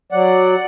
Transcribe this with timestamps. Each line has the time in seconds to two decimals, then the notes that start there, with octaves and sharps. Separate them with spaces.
0.12 F#3 D5 F#5